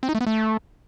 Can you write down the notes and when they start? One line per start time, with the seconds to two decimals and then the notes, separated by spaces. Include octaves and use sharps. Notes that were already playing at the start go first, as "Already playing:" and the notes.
0.03 C4
0.09 D#4
0.15 A3
0.21 B3
0.27 A3